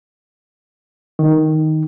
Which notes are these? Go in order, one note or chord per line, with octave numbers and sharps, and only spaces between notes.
D#3